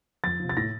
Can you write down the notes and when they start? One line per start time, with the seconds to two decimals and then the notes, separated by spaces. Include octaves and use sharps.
0.24 F2 A6
0.40 C3 F3
0.49 A6
0.57 A2 A#6